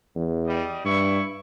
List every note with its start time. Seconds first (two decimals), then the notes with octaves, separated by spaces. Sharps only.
0.15 E2
0.47 G3 D#5
0.85 G2 E4 C#6